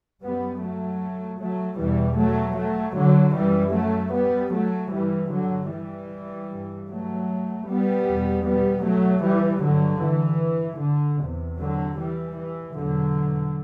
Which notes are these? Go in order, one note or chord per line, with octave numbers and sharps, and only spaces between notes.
F#2 G3 B3
F#3 A3
F#3 A3
E2 B2 E3 G3
F#3 A3
F#3 A3
D3 F#3
F#2 E3 G3
F#3 A3
G3 B3
F#3 A3
G2 E3 G3
D3 F#3
E3 G3
G2
F#3 A3
G3 B3
E2 B2
G3 B3
F#3 A3
E3 G3
G2 D3 F#3
E3
D3
E2 C3
D3 F#3
E3 G3
E3
E2 B2 D3 F#3